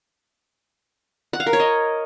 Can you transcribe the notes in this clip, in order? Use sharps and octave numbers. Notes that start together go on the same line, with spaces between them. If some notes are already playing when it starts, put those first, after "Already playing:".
F#5
F5
A#4
C#5
D#5